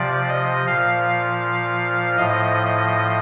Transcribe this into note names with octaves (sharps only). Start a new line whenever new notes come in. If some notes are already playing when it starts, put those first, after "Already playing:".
Already playing: C3 F3 D5
D#5
A#2 F3 F5
A2 F3 D#5